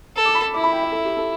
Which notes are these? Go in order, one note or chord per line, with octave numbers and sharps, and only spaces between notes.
A4
D6
B5
E4 D6
B5
G5
E5
A4
G4
A4